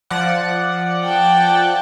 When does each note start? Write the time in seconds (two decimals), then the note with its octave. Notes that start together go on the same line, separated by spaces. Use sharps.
0.10 F3 D5 F#5
1.05 G5 A5